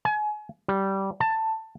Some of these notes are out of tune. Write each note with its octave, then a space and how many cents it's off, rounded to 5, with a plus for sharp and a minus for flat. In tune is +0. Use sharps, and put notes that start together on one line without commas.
G#5 +35
G3 -15
A5 +15